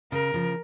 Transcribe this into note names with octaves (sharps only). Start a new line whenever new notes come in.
C#3 A#4
C#3 F3